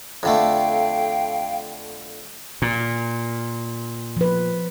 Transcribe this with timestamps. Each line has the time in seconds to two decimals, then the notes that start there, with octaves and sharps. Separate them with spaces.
0.23 F2 D3 A3 F5 G5
2.62 A#2
4.17 F3 B4